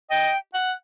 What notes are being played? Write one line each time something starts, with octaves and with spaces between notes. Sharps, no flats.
D#5 G5
F#5